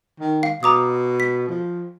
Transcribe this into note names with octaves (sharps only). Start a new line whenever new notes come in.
D#3
F5
B2 A#5 D6 D#6
B6
F3